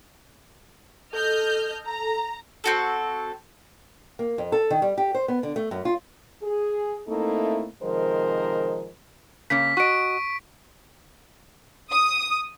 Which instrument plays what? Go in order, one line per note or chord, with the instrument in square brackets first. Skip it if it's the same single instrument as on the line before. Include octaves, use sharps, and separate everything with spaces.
[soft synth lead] A4 [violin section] D#5 F6 G6
[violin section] A#5
[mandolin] C4 F#4 A4
[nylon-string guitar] A#3
F2
A4
D#3
G3
G4
C5
B3
D3
A3
F#2
F4
[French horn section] G#4
A3 A#3 C4 D#4 E4 A4
C3 D#3 F3 G#3 A#4 C5
[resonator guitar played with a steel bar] C#3 A#3 C#4 [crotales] B6
[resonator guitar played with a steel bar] F#4 D#5 [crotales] C#6 D7
[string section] D#6